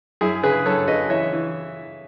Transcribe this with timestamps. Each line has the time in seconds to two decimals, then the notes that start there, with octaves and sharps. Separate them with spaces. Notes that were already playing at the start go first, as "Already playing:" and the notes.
0.21 F#2 E4 G#4
0.43 C#3 G#4 B4
0.66 F#2 A4 C#5
0.88 C#3 B4 D#5
1.10 E3 C#5 E5
1.33 E3